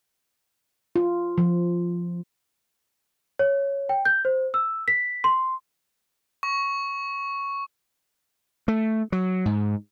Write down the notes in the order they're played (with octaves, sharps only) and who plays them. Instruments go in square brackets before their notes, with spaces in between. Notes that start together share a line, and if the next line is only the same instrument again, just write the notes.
[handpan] F4
F3
[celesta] C#5
G5
G6
C5
E6
B6
C6
[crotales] C#6
[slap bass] A3
F#3
G#2